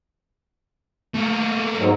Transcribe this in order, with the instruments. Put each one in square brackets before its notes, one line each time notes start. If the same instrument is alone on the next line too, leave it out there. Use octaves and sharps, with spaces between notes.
[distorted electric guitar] A3 A#3
[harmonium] G#2 F#3